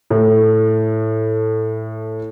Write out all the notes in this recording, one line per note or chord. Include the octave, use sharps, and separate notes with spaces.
A2 A3